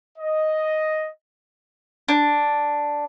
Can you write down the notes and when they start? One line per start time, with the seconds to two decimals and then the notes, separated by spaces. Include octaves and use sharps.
0.18 D#5
2.08 D4